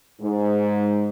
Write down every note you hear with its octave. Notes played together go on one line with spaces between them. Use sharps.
G#2